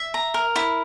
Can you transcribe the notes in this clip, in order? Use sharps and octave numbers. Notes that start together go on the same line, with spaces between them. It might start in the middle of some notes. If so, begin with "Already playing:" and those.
Already playing: E5
A#5
A#4
E4